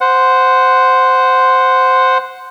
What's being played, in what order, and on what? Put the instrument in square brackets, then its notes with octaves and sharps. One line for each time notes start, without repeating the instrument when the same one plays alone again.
[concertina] C5 F#5